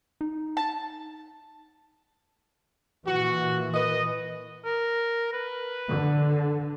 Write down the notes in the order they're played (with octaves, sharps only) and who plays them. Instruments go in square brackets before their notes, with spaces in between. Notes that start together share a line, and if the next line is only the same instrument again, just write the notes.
[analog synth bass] D#4
[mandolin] A5
[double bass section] A#2 E3 [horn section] F#4
[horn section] A#4 B4 D#5
[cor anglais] A#4
B4
[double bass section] D3